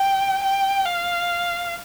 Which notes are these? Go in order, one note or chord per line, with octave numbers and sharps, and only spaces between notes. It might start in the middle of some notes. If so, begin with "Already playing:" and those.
Already playing: G5
G5
F5